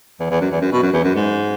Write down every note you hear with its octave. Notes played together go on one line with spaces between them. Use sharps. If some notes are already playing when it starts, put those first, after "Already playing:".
E2
E2
F#2
E2
F#2
B2
F#2
E2
F#2
G#2